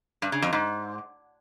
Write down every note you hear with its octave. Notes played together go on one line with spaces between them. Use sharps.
G2
C#3
F2
G#2